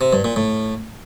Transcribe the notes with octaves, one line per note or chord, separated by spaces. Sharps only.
C3
G2
A#2
A2